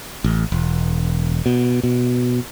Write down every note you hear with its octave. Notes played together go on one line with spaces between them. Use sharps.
A1
E1
B2
B2